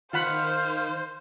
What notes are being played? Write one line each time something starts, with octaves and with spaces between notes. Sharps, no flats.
D#3 F4 C5 F5 F#5 B5